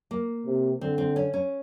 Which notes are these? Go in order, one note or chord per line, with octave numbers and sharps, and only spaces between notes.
A#3
C3
D3 C4
C4
C#4
C#4